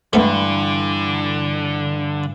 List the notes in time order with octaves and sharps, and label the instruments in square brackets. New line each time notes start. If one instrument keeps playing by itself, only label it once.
[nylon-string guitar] G2 E3 [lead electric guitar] D3 [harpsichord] A3 B3